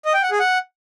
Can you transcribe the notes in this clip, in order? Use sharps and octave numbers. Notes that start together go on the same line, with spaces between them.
D#5
G5
F#5
G#4
F#5